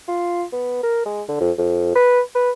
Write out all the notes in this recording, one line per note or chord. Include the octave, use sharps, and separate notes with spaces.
F4
B3
A#4
G#3
D3
F2
F2
B4
B4